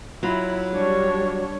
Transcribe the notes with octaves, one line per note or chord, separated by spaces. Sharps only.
F#3 E4 F4 B5
G3 D4 C#5